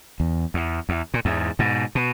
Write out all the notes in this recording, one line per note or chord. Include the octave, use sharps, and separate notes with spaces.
E2
E2
E2
A#2
E2 G#2
G#2 B2
B2